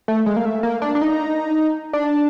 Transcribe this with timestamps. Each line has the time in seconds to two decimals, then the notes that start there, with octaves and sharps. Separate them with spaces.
0.08 A3
0.26 G#3
0.36 A#3
0.46 A3
0.63 A#3
0.82 D4
0.95 D4
1.02 D#4
1.93 D4